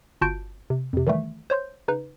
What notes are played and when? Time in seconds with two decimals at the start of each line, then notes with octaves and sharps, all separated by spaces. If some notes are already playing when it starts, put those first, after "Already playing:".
0.21 G1 F4 F#4 A5 G6 D7
0.70 C3
0.93 F2 C3
1.07 D#3 E3 G3 A3
1.50 C5 C#5 C6 G6
1.88 C#3 D#4 B4